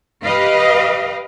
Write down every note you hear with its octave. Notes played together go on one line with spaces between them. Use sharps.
G4 B4 D#5 F5